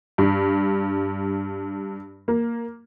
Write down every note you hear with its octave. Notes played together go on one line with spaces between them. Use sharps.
G2
A#3